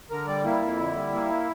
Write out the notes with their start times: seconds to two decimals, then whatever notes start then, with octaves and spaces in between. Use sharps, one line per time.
0.11 D3 A#4
0.27 G3 D5
0.45 A#3 E4
0.62 F2
0.79 D3
0.95 G3
1.13 A#3